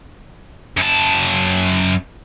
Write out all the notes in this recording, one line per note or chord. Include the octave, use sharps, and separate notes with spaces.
F#2 A5